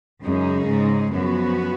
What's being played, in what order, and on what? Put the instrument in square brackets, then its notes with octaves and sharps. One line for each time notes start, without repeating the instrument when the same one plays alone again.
[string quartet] F#2 [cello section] C#3 G#3 D#4 G#4
[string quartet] G#2
[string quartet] F#2 [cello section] F3 B3 F#4